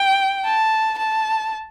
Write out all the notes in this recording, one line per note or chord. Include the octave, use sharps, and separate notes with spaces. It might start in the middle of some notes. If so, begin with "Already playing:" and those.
Already playing: G5
A5
A5